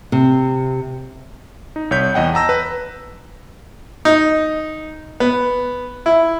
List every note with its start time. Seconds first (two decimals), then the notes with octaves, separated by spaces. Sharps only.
0.12 C3
1.76 D#4
1.91 C2 C#5 G6 B6
2.14 E2 D#5 F#5 G5
2.34 A5 A#5 E6 A#6
2.49 B4
4.05 D#4
5.20 B3
6.06 E4